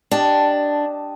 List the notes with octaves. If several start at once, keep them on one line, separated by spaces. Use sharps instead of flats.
D4 G4 D#5 A5